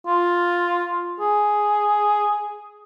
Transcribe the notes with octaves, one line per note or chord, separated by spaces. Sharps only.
F4
G#4